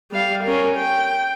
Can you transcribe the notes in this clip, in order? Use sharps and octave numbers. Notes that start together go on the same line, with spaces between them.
G3 F5
C#4 A#4
G5